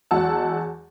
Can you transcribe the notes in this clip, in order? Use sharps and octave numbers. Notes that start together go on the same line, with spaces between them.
E2 F#3 G#3 F#5 A5 E6